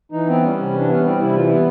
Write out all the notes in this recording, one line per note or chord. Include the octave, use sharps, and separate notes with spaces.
E3 D#4
B3 C4
G3 C#4
C3
E3 D4
B3 C#4
G3 C4
C3 E4
E3 F4
B3 E4